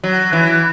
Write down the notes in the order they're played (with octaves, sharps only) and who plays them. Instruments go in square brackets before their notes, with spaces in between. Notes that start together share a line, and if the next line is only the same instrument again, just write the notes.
[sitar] F#3
E3